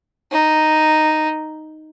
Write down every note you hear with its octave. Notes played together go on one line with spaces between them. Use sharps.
D#4